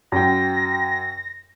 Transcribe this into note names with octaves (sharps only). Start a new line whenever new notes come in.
F#2 G5 A#6